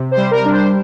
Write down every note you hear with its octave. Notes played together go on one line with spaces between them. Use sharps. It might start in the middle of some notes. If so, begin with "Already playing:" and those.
Already playing: C3
C5
G3
A#4
D4
C5